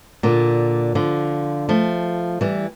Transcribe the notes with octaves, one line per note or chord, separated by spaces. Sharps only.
A#2 D3
D3 F3
F3 A3
E3 G3